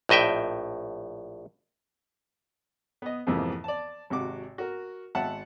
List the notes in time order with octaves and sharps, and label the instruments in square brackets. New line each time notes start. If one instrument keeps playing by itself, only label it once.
[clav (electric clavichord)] A#1 A2 D#5 E5 G5
[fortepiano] B3 D#5
F2 G#2 C3 E3 F3 A#3
D5 A5
G#1 C3 F#4 D6
F#4 A#4
G#1 E5 F#5 A5